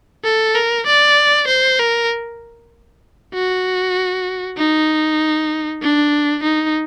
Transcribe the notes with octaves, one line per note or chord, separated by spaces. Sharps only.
A4
A#4
D5
C5
A#4
F#4
D#4
D4
D#4